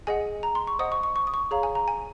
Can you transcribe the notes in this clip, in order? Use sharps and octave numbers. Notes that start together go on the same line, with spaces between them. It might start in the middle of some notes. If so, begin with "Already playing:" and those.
G#4 D#5 F#5 G#5
A#5
C6
C#6
C5 D#5 F#5 D#6
C#6
C#6
C#6
D#6
C#6
G#4 C#5 F5 A#5
G#5
A#5
G#5